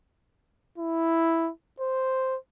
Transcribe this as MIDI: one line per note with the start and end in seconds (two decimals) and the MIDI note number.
0.78 1.51 64
1.80 2.37 72